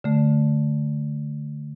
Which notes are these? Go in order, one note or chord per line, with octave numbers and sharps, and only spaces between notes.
D3 A3